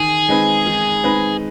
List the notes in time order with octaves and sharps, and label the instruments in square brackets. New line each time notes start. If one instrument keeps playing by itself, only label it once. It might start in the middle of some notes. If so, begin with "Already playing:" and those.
Already playing: [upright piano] D#3 [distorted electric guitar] G#4
[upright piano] G#3 C4 D#4 B4
D#3
G#3 C4 D#4 B4